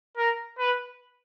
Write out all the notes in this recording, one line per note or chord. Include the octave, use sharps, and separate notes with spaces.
A#4
B4